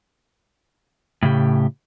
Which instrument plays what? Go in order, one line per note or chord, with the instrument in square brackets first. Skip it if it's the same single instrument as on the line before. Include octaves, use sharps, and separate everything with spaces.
[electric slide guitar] A2 C#3 G4